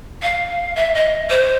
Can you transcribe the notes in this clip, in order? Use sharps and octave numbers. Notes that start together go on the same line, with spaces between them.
F5
E5
D#5
C5